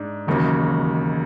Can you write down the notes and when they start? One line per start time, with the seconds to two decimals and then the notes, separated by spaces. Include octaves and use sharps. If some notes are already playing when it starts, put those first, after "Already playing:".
Already playing: G#2 D4
0.27 E1 D#2 C#3 F#3